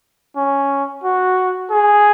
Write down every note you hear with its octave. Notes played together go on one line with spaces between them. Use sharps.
C#4
F#4
G#4